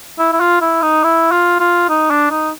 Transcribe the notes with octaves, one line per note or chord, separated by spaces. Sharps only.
E4
E4
F4
E4
D#4
E4
F4
F4
D#4
D4
D#4